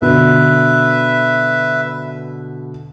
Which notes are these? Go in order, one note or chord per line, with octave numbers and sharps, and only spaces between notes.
B2 D3 B4 E5